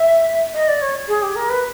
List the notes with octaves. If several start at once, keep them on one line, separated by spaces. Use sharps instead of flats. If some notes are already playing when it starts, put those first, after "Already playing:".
Already playing: E5
D#5
D5
C#5
G#4
G4
A#4
B4